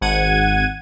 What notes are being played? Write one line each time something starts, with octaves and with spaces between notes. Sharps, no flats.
G#1 F#5 G#6 D#7